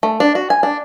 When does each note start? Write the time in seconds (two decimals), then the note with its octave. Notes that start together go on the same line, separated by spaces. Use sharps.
0.03 A3
0.20 D4
0.35 F#4
0.50 G#5
0.63 D4